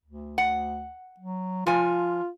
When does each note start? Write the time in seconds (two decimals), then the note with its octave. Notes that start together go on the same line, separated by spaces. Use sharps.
0.05 D2
0.38 F#5
1.20 F#3
1.67 F3 F4 G#5